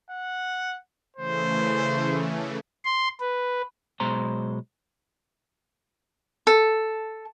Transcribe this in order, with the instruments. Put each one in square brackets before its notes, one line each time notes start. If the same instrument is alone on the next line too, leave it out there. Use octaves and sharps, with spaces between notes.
[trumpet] F#5
[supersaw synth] C#3 E3 A3 [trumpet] C5
[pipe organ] C6
B4
[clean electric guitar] B1 B2 G#3 C5 A#5
[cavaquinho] A4